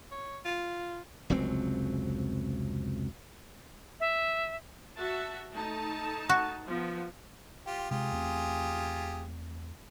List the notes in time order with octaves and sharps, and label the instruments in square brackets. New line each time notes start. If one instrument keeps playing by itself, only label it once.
[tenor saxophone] C#5
F4
[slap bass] F1 C#2 F#3 C4
[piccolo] E5
[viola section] F#4 E5 A5
A3 D#4 A5
[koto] F#4
[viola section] F3 B3
[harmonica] F4 G4
[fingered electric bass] C3 G#3 [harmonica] F4 G4 G#4
[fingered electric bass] E2 A3 C4